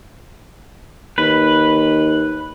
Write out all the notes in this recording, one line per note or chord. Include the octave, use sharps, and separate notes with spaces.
D#2 B4